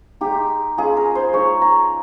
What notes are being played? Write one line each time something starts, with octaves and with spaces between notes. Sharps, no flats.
G#3 D#4 G4
G#3 C#4 F4 G#4
A#4
C5
G#3 D#4 C#5
A#5